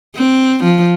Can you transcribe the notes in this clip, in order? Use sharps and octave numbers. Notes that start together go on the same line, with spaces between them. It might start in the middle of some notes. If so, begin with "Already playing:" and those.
C4
F3